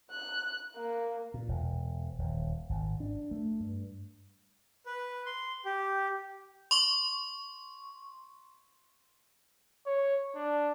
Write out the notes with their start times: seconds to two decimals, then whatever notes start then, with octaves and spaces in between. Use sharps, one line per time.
0.11 F#6
0.76 A#3
1.34 A#2
1.48 E1
2.19 D#1
2.69 G#1
3.00 D4
3.31 A3
3.60 G2
4.86 B4
5.26 C6
5.65 G4
6.71 C6 C#6
9.86 C#5
10.35 D4